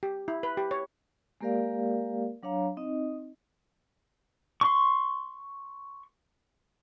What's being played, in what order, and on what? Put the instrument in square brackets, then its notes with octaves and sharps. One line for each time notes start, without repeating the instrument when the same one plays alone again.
[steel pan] G4
E4
B4
G4
C#5
[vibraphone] G#3 A#3 G4 A#4 D5 F5
F#3 D4 C#5 F5 A#5
C4 D#4 D#5
[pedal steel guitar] C6 C#6